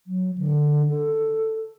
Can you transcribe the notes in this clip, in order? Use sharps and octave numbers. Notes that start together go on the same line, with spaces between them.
F#3
D3
A4